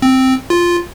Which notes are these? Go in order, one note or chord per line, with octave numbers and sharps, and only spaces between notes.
C4
F4